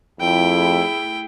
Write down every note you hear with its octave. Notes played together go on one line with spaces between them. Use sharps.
F2 A3 E4 G#4 G5